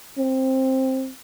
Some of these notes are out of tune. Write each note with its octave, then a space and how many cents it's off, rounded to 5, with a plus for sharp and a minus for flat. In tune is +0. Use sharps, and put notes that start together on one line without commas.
C4 +10